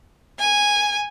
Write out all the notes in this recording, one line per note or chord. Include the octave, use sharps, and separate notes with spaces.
G#5